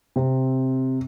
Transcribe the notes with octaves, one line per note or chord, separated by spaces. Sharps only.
C3 C4